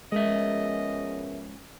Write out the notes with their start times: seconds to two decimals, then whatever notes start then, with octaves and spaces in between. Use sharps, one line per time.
0.12 F3 G#3 B3 C#4 G#4 A#4 D#5 E5